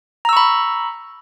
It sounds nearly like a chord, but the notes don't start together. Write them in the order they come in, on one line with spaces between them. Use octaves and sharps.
A#5 E6 C#6 B5